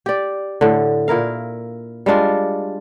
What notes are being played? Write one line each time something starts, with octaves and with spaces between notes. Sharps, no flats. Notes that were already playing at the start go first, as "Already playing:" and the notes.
G4 D5
A2 D3
A#2 E4 A#4 F5
G3 G#3 D4 F4